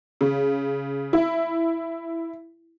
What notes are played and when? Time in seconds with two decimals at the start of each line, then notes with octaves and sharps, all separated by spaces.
0.21 C#3
1.13 E4